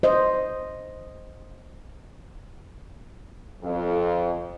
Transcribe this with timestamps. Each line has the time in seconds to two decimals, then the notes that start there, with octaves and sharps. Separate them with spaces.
0.03 C5 D#5
3.62 F2